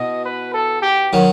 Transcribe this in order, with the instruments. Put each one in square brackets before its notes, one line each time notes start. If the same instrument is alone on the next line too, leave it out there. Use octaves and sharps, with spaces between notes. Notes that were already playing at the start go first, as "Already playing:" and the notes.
Already playing: [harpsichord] B2 E4 [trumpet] D#5
[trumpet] B4
A4
G4
[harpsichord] D#3 F#3